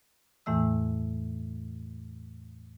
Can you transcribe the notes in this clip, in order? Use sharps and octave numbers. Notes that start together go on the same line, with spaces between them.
E2 A2 E3 A3 E5 E6